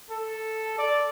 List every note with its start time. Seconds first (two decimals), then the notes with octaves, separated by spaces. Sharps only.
0.10 A4
0.78 D5